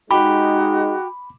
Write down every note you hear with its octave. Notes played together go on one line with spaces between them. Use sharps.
G#3 D#4 F#4 G4 B5